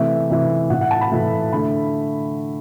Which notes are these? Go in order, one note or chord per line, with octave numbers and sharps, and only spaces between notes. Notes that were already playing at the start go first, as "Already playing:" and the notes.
Already playing: C3 E3 A3 E5
C3 E3 A3
A2 E3 A3 F#5
F#5
A5
B5
A2 E3 A3
D3 A3 B5